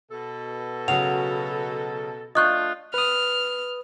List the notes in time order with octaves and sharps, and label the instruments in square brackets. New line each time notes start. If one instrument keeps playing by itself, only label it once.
[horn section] B2 A4
[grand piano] C#3 F#3 [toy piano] F#5 [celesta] F7
[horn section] A3 D4 F4 [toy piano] D#5 C#6 [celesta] D#6 F#6 G6
[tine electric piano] B4 D#6 [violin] F6